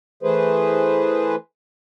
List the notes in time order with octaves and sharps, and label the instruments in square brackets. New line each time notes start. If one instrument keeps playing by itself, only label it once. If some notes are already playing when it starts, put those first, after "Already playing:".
[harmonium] E3 A3 G#4 B4 C5